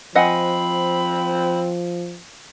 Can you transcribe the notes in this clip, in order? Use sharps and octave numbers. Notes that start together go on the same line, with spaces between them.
F3 C4 D#5 F#5 G#5 B5